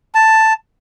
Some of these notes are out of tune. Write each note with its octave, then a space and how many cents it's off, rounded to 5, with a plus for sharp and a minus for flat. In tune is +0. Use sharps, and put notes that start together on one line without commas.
A5 +5